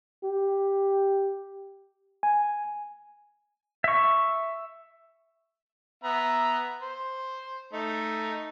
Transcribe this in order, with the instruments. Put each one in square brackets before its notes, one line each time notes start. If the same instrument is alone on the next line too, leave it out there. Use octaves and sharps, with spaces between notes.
[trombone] G4
[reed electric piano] G#5
[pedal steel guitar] E5 C#6
[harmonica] B3 E5 A#5
C5
A3 D#4